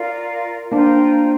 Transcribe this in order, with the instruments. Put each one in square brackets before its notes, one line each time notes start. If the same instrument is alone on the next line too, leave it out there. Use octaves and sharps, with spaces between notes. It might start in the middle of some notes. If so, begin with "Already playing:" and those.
Already playing: [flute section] F4 A#4 D5 F5
[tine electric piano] A#3 D4 [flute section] F4 C5 G5 A#5